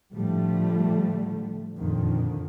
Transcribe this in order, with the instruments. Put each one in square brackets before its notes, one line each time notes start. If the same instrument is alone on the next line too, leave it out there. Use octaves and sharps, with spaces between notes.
[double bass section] A2 D3 F3 G3 A3
F2 A#2 D3 D#3